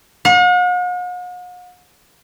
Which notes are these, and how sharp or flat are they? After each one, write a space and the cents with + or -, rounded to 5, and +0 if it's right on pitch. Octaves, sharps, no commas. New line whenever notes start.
F#5 -45